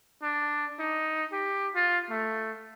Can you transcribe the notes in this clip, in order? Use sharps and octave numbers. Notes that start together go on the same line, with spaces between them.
D4
D#4
G4
F4
A3